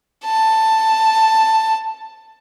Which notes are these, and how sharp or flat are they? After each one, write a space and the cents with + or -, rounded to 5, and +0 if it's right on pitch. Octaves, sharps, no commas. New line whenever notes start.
A5 +10